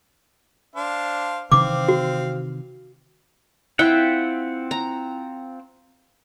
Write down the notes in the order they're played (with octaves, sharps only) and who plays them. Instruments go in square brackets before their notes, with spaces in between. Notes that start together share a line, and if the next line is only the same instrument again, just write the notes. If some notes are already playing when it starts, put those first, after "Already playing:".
[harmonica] D4 C5 F5
[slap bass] C3 D#3 E3 [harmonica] C4 F5 [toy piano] D6
[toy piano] F#4
[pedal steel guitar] C4 F4 F#5 [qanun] E4 E5 G5
[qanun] A#5